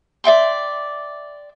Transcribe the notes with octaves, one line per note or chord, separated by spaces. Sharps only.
D5 E5 G5 C6